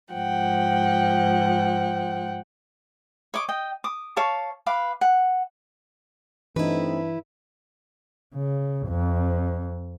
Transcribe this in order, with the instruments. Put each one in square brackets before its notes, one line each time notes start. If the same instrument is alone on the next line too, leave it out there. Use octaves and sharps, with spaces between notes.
[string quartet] G#2 F3 F#5 G5
[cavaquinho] C#5 D#5 D6
D#5 G5
D6 D#6
C#5 F5 A5 D6
B4 F5 D6
F#5
[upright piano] G2 [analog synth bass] E3 [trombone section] A3 C4 D#4 [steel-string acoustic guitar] E4 B4
[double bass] C#3
F2